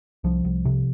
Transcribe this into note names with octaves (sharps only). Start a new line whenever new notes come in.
C2 F3
C2
C3